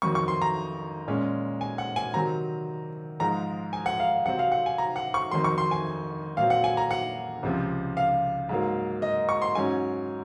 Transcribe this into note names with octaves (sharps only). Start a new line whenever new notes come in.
F2 D#3 F#3 C#6
C#6
C6
A#5
A#2 G#3 C#4
G#5
F#5
G#5
C3 D#3 F#3 C4 A#5
G#2 F3 G#3 A#5
G#5
F#5
F5
C3 F#3 C4 F#5
F5
F#5
G#5
A#5
F#5
C#6
F2 D#3 F#3 C6
C#6
C6
G#5
A#2 F#3 C4 F5
F#5
G#5
A#5
F#5
C#2 C3 F3
F5
G#2 F#3 A#3
D#5
C#6
C6
G#2 F#3 C#4 G#5